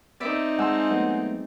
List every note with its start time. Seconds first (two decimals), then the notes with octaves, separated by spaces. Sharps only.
0.20 C4 D#4 D5 E5
0.59 G#3 F#5 G#5 A5 C6 E6
0.91 F#3 A3 B3